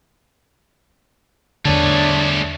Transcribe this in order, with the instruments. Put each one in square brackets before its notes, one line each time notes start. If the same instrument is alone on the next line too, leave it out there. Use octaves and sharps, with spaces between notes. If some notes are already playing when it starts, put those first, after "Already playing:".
[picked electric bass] E2 D3 [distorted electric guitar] A3 G#4 [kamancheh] D4 C#5